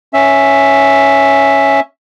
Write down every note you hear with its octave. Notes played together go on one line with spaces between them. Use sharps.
C#4 E5